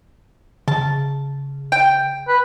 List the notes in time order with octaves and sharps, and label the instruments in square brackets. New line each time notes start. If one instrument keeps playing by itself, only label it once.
[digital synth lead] C#3 [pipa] A5
[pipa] G5
[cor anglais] B4